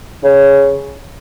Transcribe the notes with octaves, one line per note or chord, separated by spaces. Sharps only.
C#3